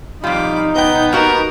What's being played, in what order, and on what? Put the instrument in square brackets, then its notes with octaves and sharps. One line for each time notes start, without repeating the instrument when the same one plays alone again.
[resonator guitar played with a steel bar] F2 G3 [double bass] D#4 [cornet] F4 [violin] B5 D6
[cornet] B3 [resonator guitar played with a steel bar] D#5 G5 [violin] G6
[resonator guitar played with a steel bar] A#3 F#4 G4 [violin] A#4